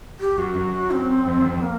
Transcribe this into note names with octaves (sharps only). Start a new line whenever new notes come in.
G4
F#2 F#4
F#2
C4
F2
E2
F2
A#3